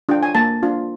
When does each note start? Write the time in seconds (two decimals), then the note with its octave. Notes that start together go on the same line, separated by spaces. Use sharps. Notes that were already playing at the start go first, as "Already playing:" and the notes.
0.09 D4 F4 G5
0.23 G#5
0.35 A#3 A5
0.62 D4 F4